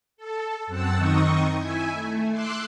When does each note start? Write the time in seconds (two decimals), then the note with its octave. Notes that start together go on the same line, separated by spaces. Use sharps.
0.17 A4
0.67 F#2 C4 F#5 A5 E6
0.97 D#3 C4 D#4 D#5 C#6 D#6
1.58 E4 E5 G#5
1.92 A3
2.31 C6 D6 E6 F#6